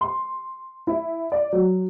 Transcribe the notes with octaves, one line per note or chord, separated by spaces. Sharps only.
C6
E4
D5
F#3